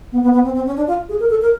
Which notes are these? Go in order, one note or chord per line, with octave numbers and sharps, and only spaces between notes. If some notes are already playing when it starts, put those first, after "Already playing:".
B3
B3
B3
C4
C4
C#4
D4
F4
G#4
A#4
A4
A#4